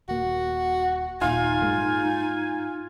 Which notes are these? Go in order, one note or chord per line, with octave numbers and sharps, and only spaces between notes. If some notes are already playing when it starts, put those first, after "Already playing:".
D#1 A#3 F#4
D#1 A#2 D#4 F4 G#5
G#2 G#3 A#3